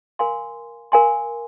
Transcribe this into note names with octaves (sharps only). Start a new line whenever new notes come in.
A#4 F5 G#5 C6
A#4 F5 G#5 C6